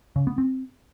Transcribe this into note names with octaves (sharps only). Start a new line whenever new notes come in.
C#3
B3
C4